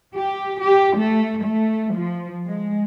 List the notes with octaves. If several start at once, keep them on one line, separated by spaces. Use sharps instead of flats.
G4
G4
A3
A3
F3
G#3